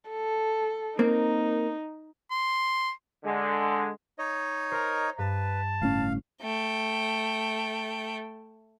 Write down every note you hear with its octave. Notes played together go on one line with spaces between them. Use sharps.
A4
A#3 C4 D#4 A#4
C6
D3 G#3
D#4 C#5 D#5
A#4 C5 A#5
G2 B4 A5
G1 A2 C#4 F5
A3 G5